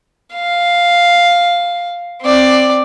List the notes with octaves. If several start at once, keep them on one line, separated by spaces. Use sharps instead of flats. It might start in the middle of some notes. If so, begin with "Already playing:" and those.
F5
C4 D5